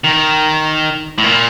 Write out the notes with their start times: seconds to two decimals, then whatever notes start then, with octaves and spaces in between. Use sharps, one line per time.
0.04 D#3
1.18 A2
1.24 A#2